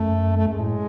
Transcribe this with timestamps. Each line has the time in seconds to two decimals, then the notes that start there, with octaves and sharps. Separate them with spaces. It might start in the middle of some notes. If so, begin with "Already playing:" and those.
Already playing: F#2 A3
0.37 A3
0.47 F#2 G#3
0.60 A2